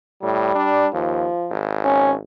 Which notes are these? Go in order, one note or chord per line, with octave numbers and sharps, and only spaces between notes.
A2 G3
D4
D#2 F3
G#1
C#4